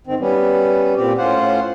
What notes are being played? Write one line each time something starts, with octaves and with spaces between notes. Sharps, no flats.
G#2 D#3 C4
G3 B3 C#4
A#2 C4 G4
A2 C#4 F4 C5 F#5